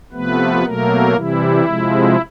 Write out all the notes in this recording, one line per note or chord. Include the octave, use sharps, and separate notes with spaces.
C3 F3 A3 B3 B4
B2 F#3 A3 A#3 A#4
C3 E3 G3 E4
C3 F3 G#3